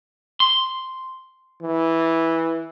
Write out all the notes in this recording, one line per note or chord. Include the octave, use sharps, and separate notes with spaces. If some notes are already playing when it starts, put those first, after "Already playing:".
C6
E3